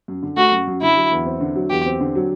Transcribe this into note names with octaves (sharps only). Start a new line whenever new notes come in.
F#2
D3
A3 F#4
F#2
F#2
D3 E4
F#3
E2
C4
D3
F#3
E2 G4
C4
D3
F#3